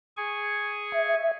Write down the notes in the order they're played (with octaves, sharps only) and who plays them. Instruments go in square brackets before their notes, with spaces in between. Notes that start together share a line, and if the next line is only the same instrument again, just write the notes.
[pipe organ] G#4 G#5 C#6
[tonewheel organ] E5